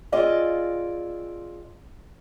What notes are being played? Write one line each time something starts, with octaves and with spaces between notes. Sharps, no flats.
C4 F4 G#4 D5 D#5 F5